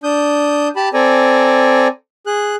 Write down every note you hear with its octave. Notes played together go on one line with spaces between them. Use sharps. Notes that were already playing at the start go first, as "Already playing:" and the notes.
D4 D#6 G6
G4 A5 B5
C4 A4 D5 G#5 A#5
G#4 F#6